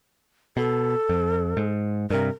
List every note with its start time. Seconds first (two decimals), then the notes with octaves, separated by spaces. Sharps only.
0.57 B2 A4
1.09 F2
1.57 G#2
2.10 G2 C3 A#4